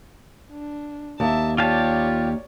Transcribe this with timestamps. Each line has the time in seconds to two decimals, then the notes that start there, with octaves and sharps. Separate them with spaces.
0.51 D4
1.20 D#2 E5 A5
1.58 F4 G4 C#5 D5 A5